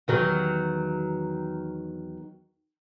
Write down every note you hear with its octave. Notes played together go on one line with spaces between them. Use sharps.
E2 D#3 F#3